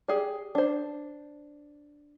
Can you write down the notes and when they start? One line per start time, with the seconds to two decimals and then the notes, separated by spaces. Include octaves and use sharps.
0.08 G4 G#4 D5
0.55 D4 C5